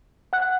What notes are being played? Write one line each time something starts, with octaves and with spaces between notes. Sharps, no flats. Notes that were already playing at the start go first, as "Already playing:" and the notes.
F#5 F#6